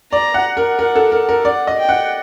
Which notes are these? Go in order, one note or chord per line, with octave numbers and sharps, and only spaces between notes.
D5 A#5
F#5
A#4
A#4 F#5
A4
A#4 F#5
A#4
D5 F#5
D#5
G5
F#5